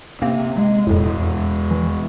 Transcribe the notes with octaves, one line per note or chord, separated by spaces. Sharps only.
C3 A#3 C4
G#3
E1 F2 A2
E3